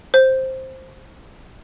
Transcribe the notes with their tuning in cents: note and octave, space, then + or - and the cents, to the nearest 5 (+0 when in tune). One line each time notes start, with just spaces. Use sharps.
C5 +5